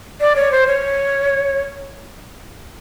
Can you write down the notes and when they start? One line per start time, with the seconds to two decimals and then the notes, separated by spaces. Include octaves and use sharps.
0.20 D5
0.36 C#5
0.52 C5
0.67 C#5